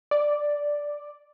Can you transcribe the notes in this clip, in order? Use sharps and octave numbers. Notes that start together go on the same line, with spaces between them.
D5